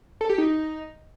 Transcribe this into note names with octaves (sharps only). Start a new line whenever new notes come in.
A4
G4
D#4